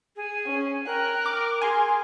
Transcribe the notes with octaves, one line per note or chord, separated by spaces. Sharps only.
G#4
C#4
A#4 G5 F#6
D6
G#4 G#5 C6